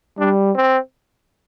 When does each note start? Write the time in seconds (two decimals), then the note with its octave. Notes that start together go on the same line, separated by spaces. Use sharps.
0.19 G3 D4
0.55 C4